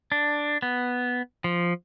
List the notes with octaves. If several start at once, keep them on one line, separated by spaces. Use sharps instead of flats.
D4
B3
F3